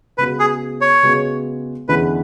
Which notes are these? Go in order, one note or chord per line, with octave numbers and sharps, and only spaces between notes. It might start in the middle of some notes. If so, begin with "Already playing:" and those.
C#3 G#3 B3 F#4 B4
G#4
C#5
C#3 G#3 B3 F#4
E2 D3 G#3 C#4 E4 B4